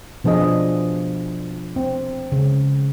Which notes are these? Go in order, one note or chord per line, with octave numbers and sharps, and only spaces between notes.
B2 F3 D4 G#4 D#5
B3
C4
C#3